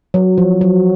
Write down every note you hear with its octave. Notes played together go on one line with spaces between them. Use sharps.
F#3
F3
F#3